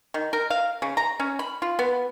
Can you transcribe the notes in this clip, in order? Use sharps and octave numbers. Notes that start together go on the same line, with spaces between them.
D#3
A#4
F5
C#3
A#5
C#4
B5
F4
B3